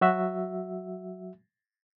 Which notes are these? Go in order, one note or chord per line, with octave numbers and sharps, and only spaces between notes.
F#3 F#4 E5